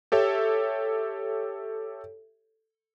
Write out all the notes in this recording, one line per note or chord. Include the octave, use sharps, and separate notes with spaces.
G4 A4 C#5 E5